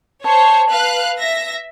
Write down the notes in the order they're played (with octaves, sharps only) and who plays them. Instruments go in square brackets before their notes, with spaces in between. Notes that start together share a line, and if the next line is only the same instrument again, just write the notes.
[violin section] C5 C#5 [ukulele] A5
[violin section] B4 F5 F#6
E5 A#6